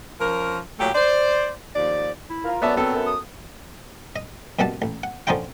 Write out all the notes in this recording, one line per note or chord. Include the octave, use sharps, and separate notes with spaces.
F3 C#4 A#4
A#2 F#3 A3 G4
C5 D5
D#2 F3 D5
E4
F4 A#4
F#2 D3 F#3 B3 D5 E5 A5
B3 C4 A4
F#2
D#6
D#5
F#2 B2 G3 F#5 A5
A1
F#5
D3 F3 C#4 D#4 F4 G5